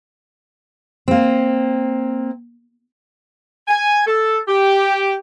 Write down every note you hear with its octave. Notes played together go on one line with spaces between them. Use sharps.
A#3 C4
G#5
A4
G4